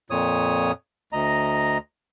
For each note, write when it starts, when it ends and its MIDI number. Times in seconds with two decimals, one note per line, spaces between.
0.10 0.72 41
0.10 0.72 46
0.10 0.72 73
0.10 0.72 87
1.13 1.78 38
1.13 1.78 75
1.13 1.78 82